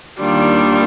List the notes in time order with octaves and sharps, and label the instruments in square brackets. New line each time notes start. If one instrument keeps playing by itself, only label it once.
[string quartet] D#2 D#3 G3 D4 F4